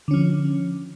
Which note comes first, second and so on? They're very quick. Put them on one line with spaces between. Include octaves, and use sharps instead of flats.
D3 C#4 F3